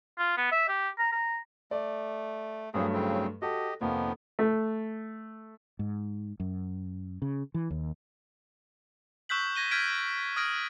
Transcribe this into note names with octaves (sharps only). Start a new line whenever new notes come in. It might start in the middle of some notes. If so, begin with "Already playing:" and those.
F4
B3
E5
G4
A#5
A#5
A3 D5
G2 F#3 A3 A#3 C4 G#4
A2 C#3 C4
F#4 G4 A4 D#5
F1 D#3 F3 A#3 B3
A3
G#2
F#2
C#3
E3
D#2
C#6 E6 F#6 G6 B6 F#7
G#6 A#6 D#7 G7
F6 G6 G#6 B6 D7
D#6 F6 G#6 A#6 D7